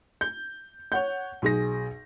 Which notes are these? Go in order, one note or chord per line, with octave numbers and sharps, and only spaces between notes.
G6
C#5 F#5 G6
B1 G#4 A#6